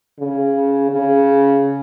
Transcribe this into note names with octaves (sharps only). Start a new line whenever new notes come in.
C#3
C#3